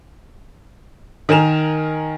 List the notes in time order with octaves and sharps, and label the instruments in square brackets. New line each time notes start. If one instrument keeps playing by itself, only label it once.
[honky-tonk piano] D#3 A#4 G#5 E7 F7